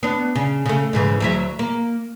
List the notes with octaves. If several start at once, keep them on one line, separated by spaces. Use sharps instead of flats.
B3 D4
C#3
C#3 A3
G#2 C#3 E3
D2 F#3 E5
A#3